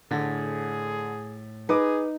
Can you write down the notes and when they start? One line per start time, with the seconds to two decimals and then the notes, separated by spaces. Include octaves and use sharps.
0.11 A2 D3 G#4
1.69 D#4 G#4 B4 D6